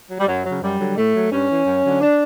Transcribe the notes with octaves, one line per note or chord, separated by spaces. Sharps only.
F#3
G3
F#2 F#3
C#3 F#3
F#2 G3
D3 F#3
A2 A3
F#3
G2 C#4
E3
F#2
D3 F#3
D4